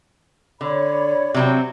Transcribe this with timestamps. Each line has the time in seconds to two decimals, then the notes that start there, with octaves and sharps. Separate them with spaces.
0.61 D3 C#5 D5 B5
1.34 C3 F#3 C4